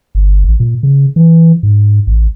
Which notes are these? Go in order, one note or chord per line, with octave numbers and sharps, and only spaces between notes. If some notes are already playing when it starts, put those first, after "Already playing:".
G1
A1
A#2
C#3
E3
G#2
A1